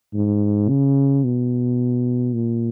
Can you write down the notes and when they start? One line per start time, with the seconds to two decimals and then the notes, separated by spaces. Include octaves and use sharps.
0.14 G#2
0.69 C#3
1.24 B2
2.34 A#2